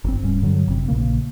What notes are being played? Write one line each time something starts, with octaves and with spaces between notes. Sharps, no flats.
G1 F#2 D3 C4
D1 G#2 G3 C#4
G2 D3 F#3
G1 F#2 C3 C4
A#1 A#2 C#3 A#3